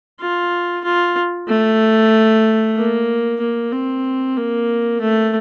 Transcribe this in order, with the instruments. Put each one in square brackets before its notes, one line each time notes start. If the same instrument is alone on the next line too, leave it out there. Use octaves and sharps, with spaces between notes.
[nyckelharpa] F4
F4
A3
A#3
A#3
C4
A#3
A3